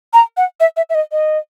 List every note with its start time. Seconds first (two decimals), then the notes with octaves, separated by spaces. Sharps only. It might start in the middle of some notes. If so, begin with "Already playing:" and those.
0.13 A#5
0.37 F#5
0.60 E5
0.77 E5
0.89 E5
0.94 D#5
1.12 D#5